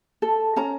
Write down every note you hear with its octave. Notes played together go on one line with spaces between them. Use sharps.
A4
C#4 A#5